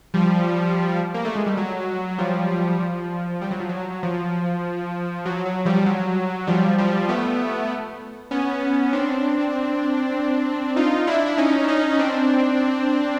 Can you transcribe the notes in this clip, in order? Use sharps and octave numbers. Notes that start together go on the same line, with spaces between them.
F3 G3
A#3
A3
G#3
G3
F#3
F3 G3
F3
G3
F#3
F3
F#3
F3
F#3
F#3
F3 G3
F#3
F3 G3
F3 G3
A3 B3
B3 C#4
C4 D4
D#4 F4
D4 E4
D4
C#4 D#4
D4
C#4 D#4
C4 D4